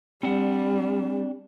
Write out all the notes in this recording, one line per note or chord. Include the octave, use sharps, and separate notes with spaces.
G3 C4 D4 F#5